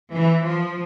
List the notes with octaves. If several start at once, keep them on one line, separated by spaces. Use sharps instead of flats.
E3
F3